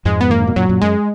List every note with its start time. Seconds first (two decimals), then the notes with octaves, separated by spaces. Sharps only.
0.05 F2 G#2 G#3
0.21 B3
0.30 D#3 A#3
0.39 D3
0.47 B2
0.56 F#2 A#2 F#3
0.69 F#2 A#2
0.82 F#2 G#3